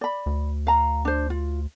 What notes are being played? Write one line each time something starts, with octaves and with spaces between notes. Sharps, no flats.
D5 B5
D2
F5 A#5
D4 C5
F4